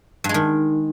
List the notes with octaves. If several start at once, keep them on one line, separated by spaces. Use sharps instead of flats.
G2
G#3
D#3